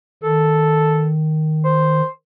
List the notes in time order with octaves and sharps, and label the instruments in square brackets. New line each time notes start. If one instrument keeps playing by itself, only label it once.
[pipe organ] D#3 [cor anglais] A4
[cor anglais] C5